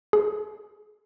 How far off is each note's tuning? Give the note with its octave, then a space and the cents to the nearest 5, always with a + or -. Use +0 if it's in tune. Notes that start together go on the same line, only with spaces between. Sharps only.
G#4 +35